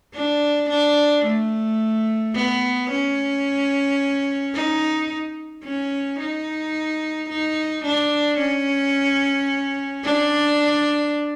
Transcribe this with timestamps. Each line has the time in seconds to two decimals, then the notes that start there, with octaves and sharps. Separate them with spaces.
0.15 D4
0.70 D4
1.25 A3
2.35 B3
2.91 C#4
4.55 D#4
5.64 C#4
6.20 D#4
7.30 D#4
7.85 D4
8.39 C#4
10.04 D4